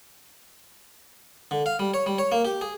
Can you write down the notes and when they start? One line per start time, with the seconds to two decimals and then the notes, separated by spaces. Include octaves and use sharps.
1.51 D3
1.66 F5
1.79 G3
1.94 C#5
2.06 G3
2.18 C#5
2.32 A#3
2.45 G4
2.61 G#4